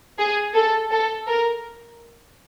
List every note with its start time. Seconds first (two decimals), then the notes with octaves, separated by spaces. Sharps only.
0.18 G#4
0.54 A4
0.91 A4
1.27 A#4